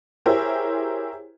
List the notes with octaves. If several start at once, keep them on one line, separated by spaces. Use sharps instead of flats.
E4 G4 G#4 A#4 C5 C#5